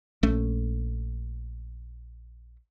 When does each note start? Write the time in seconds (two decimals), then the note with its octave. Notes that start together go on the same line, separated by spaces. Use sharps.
0.23 A#1 A3 C#4